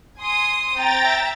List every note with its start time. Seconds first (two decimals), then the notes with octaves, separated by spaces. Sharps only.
0.18 G#5 C6 D#6
0.74 C4 G5 A#5 A6
1.04 E5